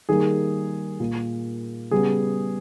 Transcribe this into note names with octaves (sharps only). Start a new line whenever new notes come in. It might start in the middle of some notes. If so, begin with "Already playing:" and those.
D#3 G3 A#3 G#4
A#2 A#3
C#3 G3 B3 G#4